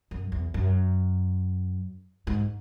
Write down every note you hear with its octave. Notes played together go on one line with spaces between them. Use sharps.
F#2
E2
F#2
G#2